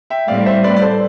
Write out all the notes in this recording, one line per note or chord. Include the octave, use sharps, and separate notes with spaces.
E5 G5
A2 G3 C4 D5 F5
C5 E5
B4 D5
D5
A4 C5